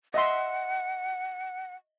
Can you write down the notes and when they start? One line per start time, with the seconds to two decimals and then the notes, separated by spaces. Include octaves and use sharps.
0.14 D#5 E5 F#5 C6